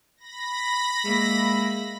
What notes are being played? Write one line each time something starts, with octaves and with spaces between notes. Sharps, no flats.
B5 A#6
G#3 A#3 E5